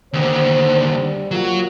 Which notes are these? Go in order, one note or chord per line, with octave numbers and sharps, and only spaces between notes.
D#2 D3 C5
G3
F#3 G3 A#3 F4 F#4